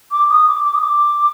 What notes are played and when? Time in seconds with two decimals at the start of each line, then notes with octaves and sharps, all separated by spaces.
0.11 D6
0.29 D#6
0.48 D6
0.65 D6
0.75 D#6
0.82 D6